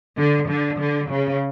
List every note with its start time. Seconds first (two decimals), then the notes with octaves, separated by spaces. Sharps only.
0.18 D3
0.49 D3
0.79 D3
1.11 C#3